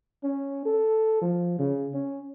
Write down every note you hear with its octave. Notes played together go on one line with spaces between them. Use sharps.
C#4
A4
F3
C#3
C#4